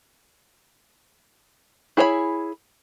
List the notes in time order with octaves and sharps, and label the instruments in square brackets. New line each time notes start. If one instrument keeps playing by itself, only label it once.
[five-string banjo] E4 G#4 C#5 D#5 B5